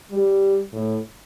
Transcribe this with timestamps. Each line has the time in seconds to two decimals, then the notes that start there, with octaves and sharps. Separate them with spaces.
0.11 G3
0.72 A2